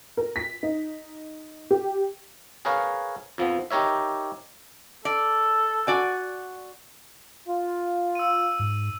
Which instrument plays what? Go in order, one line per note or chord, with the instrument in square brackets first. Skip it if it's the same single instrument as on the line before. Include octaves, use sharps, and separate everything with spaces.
[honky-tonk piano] A#4
B6
D#4
G4
[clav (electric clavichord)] G#4 A#4 B4 C#5 F5
F2 F3 B3
D#4 G4 A#4 C#5 E5
[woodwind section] A4 [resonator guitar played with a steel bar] D5
[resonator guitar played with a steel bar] F#4 D5 G#5
[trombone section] F4
[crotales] E6 D#7
[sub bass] G#2